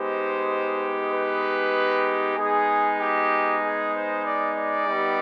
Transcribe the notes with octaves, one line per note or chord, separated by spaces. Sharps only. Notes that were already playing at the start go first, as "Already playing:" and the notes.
Already playing: G#3 B3 D#4 G4 C5
B4
G#3 B3 D#4 G#4
G4
G#4
C5
D5
D5
G3 B3 D#4 G4